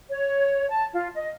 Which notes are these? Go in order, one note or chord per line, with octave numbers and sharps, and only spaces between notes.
C#5
A5
F4
D#5